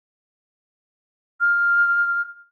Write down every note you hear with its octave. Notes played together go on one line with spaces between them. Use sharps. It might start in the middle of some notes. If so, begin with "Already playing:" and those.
F6